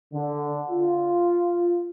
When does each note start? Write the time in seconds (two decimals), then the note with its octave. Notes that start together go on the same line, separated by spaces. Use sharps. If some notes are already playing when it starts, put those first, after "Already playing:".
0.13 D3
0.71 F4